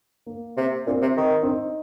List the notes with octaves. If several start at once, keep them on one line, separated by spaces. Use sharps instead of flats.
A#3
C3
A#2 C4
C3
D#3
C4
D#4